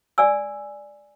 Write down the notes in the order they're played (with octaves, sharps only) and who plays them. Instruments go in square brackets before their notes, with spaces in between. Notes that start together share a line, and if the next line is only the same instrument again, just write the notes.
[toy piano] D5 G#5 E6